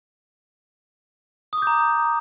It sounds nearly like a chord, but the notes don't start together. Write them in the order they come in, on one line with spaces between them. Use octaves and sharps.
D#6 D6 G6 A#5